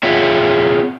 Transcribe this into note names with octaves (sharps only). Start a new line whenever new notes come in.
C4 F4 G#4 C#5 E5 F#5